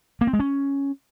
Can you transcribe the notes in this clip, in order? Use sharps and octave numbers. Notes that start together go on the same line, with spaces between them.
A#3
C4
G#3
C#4